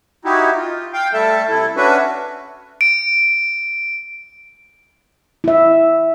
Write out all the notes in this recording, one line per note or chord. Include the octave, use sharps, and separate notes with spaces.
D#4 E4 F#4 G4
F4
F5 G5
G3 A3 A4 E5 A5
C3 E4 A4
C#4 D4 F#4 B4 E5
D7
E4 E5